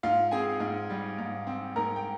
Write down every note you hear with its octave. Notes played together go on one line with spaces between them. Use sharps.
G#2 F4 F5
C4 G#4 G#5
G#2
G3
G#2
C4
G#2 A#4 A#5
G5